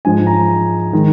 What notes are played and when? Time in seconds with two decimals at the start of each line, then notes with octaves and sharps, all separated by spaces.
0.05 G#2 F3 G#3 G#5
0.27 A#5
0.93 D#3 G#3